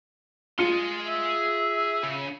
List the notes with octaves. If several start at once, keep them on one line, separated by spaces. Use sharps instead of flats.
F4 G#4 C6 C#7 D#7
E5
C#3